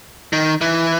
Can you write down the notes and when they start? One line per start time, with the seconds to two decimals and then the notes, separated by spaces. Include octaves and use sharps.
0.33 D#3
0.61 E3